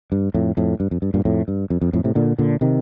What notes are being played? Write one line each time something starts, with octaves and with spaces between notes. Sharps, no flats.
G2
F2 A2
F2 A2
G2
F2
G2
G2 A#2
F2 A2
G2
F2
F2
F2 A2
A2 C3
A#2 D3
A#2 D3
C3 D#3